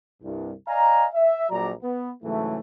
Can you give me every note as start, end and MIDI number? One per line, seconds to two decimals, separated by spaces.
0.23 0.51 36
0.23 0.51 43
0.68 1.05 74
0.68 1.05 75
0.68 1.05 77
0.68 1.05 80
0.68 1.05 82
1.13 1.49 76
1.50 1.70 34
1.50 1.70 54
1.50 1.70 74
1.50 1.70 82
1.82 2.10 59
2.23 2.58 44
2.23 2.58 49
2.23 2.58 52
2.23 2.58 54
2.23 2.58 57